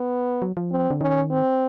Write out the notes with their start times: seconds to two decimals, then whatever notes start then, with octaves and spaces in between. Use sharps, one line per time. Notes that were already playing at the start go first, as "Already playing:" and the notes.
Already playing: B3
0.42 F#3
0.57 F3
0.71 C4
0.90 D3
1.01 D#3 C#4
1.30 C4